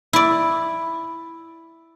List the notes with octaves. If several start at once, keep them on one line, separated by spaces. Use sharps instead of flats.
E4 D5